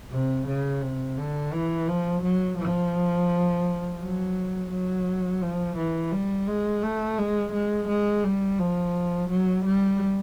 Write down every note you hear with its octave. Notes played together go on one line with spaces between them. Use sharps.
C3
C#3
C3
D3
E3
F3
F#3
F3
F#3
F#3
F3
E3
G3
G#3
A3
G#3
G#3
G#3
G3
F3
F#3
G3